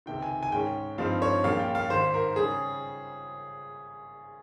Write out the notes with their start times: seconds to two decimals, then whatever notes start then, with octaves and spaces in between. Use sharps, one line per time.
0.06 C#2 C3 D#3 G5
0.22 G#5
0.43 G#5
0.52 G#2 D#3 G#3 C#4 G5
0.98 G2 F3 G#3 C4 D#4 F5
1.22 C#5
1.44 A#1 A#2 G3 A#3 C#4 F5
1.59 G5
1.75 F5
1.90 G#1 G#2 D#3 C5
2.14 A#4
2.36 C#3 G3 C#4 G#4